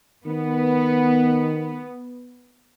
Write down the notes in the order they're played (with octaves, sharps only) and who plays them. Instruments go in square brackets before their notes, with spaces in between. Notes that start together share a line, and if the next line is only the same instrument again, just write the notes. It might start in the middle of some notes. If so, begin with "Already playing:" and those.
[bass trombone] D#3 [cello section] B3